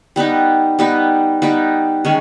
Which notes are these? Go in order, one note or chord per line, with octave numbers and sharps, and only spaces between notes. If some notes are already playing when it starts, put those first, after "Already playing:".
G3 B3 D#4
G3 B3 D#4
G3 B3 D#4
D#3 G#3 C#4